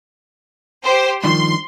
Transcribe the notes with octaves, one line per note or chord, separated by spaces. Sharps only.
G4 C5
G2 D#3 F3 C6